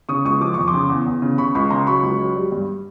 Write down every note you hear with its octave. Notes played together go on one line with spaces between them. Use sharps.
C#3 C#6 D#6
C#2 C#6 D#6
F3 D6
F2 C#6
C6 D6
C#3
E2
E2
C#3
C#3 B5 C#6
C#2 B5 C#6
C#3 A#5 C6
F#3 B5 C#6
C#2
F#3
G3
G2